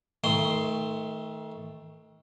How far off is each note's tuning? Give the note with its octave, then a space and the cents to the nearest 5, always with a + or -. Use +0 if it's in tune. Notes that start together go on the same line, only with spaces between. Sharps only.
D#3 +30 A3 +0 C6 +0